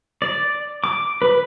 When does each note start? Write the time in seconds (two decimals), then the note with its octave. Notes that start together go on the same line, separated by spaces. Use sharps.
0.22 D5
0.84 D6
1.22 B4